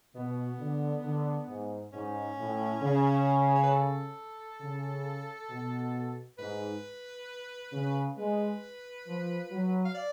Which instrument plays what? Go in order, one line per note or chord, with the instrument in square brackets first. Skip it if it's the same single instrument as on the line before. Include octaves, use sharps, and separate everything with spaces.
[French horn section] B2 [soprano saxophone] B3
[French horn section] D3
D3
G#2
[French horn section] G#2 [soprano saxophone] C#4
[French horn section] A2
C#3
[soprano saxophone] C#5
B4
A4
[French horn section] C#3
B2
[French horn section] G#2 [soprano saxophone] B4
[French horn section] C#3
[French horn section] G#3 [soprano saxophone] B4
[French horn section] F3
F#3
[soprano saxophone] F5
D5